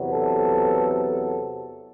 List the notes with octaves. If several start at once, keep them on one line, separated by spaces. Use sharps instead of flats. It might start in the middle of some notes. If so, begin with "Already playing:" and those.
Already playing: E2 C3 F#3 B3
A4